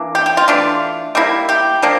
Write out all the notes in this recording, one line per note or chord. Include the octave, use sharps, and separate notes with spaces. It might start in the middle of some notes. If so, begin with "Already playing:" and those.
Already playing: E3 A#3 D4
G4
G4
F4
E3 A3 D4 F4
G3 A#3 E4
G4
F3 A#3 D4